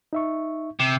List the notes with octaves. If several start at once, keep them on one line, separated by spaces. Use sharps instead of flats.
D#4 E5 C#6
C3